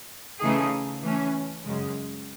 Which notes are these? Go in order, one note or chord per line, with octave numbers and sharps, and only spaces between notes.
C#3 E3 A3 D#4 G#4
E3 A3 C#4
F#2 C#3 G#3